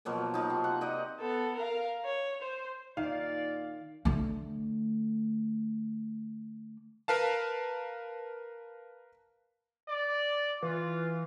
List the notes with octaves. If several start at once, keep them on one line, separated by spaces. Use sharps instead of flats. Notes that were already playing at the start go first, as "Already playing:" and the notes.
B2 F3 F#3 A#3
F3 F#3 D#4
C3 C6
F#5
D#4 D5 D#5
B3 A4
A#4 F5
C#5
C5
A#2 D#3 D5 F5
D3 A3
A#4 B4 F5 A5
D5
E3 F4